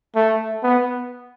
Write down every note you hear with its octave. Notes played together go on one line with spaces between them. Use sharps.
A3
B3